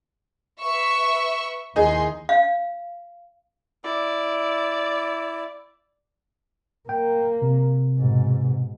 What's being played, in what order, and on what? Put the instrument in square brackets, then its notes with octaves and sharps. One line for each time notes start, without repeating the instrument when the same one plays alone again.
[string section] B4 E5 C#6
[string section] D#2 E3 C6 [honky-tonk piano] D#4 G#4
[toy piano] F5
[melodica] E4 [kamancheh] D5
[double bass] A#3 [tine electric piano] G5
[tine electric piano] C3
[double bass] G#2 B2